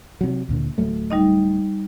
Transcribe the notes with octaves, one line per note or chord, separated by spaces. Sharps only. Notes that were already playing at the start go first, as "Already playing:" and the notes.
C3 F#3
D2 A#2 D3
D1 F#3 A3
G3 D#4 D#5